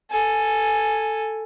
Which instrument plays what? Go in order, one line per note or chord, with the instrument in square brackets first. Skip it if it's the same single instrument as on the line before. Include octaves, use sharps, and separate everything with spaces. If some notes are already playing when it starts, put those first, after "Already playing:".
[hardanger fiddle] A4 G#5